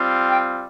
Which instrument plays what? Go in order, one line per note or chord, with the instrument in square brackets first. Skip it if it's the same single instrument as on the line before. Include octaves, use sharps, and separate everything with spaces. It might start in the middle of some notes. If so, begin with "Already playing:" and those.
Already playing: [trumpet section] G3 C4 F4
G5